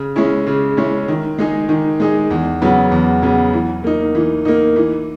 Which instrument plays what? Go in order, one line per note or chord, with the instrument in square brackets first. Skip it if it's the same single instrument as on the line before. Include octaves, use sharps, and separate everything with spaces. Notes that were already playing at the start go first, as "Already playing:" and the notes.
Already playing: [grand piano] C#3
G#3 C#4 E4
C#3
G#3 C#4 E4
D#3
G#3 D#4 G#4
D#3
G#3 D#4 G#4
E2
C#3 F#3 B3
E2
C#3 F#3 B3
E3
A#3 D#4
E3
A#3 D#4
E3